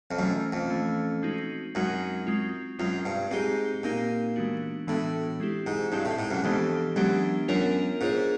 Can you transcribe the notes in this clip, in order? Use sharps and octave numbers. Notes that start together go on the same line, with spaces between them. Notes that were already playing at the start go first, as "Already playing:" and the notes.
F2
F#2 E3 A3 C#4
F2
E3 A3 C#4
G#3 C4 D#4 F#4
F#2 G#3 C4 D#4 F#4
G#3 C4 F4
F#2 G#3 C4 F4
G2
G#2 C4 D#4 G4
A#2 C4 D#4 G4
E3 G#3 B3 D4 F#4
A2 E3 G#3 B3 D4 F#4
G#3 C4 E4 G4
G#2
G2 G#3 C4 E4 G4
A2
G#2
F#2
F2 E3 G#3 B3 D4 G4
F#2 E3 G#3 B3 D4 G4
F#2 B3 D4 F4 A#4 C#5
G#2 B3 D4 F4 A#4 C#5